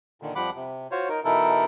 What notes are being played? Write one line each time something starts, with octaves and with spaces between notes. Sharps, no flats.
A#2 D3 D#3
F2 F3 G3 F#5 B5 D6
C3
F4 F#4 C5 C#5
D#4 A#4
B2 E3 D#4 E4 A4 A#4